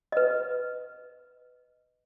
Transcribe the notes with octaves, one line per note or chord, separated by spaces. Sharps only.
B4 D#5